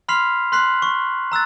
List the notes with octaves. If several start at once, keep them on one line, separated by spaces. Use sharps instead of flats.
B5 C6 F6 B6 C7 F7
C6 F#6 B6 C7 F#7
C#6
A#5 E6 F#6 A6